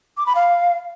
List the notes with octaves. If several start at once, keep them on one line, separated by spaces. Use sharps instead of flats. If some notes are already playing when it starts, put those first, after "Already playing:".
D6
B5
F5